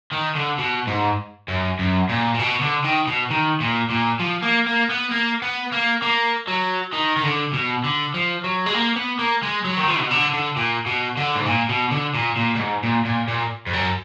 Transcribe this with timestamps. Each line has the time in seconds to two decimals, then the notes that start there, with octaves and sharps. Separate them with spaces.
0.12 D#3
0.35 D3
0.58 B2
0.87 G#2
1.48 F#2
1.79 F#2
2.09 A#2
2.34 A#2
2.39 B2
2.61 D3
2.84 D#3
3.07 B2
3.30 D#3
3.60 A#2
3.90 A#2
4.20 F3
4.43 A#3
4.66 A#3
4.89 B3
5.11 A#3
5.42 B3
5.72 A#3
6.02 A#3
6.47 F#3
6.93 D#3
7.16 D#3
7.24 D3
7.53 B2
7.84 D3
8.14 F3
8.44 F#3
8.66 G#3
8.75 A#3
8.96 B3
9.19 A#3
9.43 G#3
9.64 F#3
9.77 D#3
9.88 F3
10.00 B2
10.10 D3
10.33 D3
10.56 A#2
10.86 B2
11.17 D3
11.36 G#2
11.46 A#2
11.70 B2
11.92 D3
12.15 A#2
12.37 A#2
12.56 A#2
12.59 G#2
12.83 A#2
13.05 A#2
13.28 A#2
13.66 F2
13.73 F#2